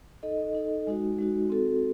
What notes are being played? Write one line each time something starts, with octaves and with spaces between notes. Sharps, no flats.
D#4 A4 D#5
D#4 A4 D#5
G#3 D#4 F#4
G#3 D#4 F#4
C4 F#4 A4